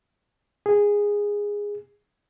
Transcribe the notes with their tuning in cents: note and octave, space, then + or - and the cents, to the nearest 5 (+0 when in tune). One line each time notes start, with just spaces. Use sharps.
G#4 -15